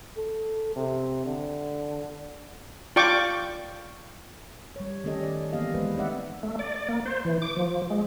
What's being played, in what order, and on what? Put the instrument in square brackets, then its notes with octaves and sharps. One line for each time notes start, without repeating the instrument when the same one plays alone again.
[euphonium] A4
C3
D3
[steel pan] F4 D5 G5 C#6 D6
[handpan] G3 C#5
D#3 A3 C#4 G4 A4 D#5
D5
E3 A#3 B3 G4 D#5 F5
E3 G#3 B3 B4 C5
A3 C4 D#4 D5 E5 F#5
[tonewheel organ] A3
D5
D5
A#3
C5
E3
D6
F3
G#3